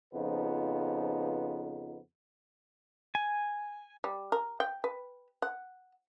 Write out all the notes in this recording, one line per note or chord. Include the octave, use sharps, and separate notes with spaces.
F2 C#3 F3 B3 D#4 B4
G#5
G3
A#4
G5
B4
F#5